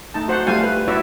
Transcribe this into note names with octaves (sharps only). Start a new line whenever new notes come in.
A3 D#4 A5
F#4 C5 F#5
G3 A3 F4 F5 G#5
B4
E4 F#4 C#5 D5 E5